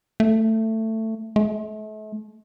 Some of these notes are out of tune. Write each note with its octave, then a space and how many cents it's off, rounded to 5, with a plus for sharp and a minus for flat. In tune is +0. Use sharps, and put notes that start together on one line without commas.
A3 +15
A3 -40